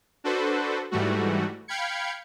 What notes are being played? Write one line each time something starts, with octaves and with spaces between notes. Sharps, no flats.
D4 F#4 A4 B4 C5
G#2 E3 G3 A3 F#4
F5 G5 B5 G#6 C#7